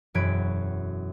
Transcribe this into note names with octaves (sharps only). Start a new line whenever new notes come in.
E1 F#2 F#3 B5 G#6 D7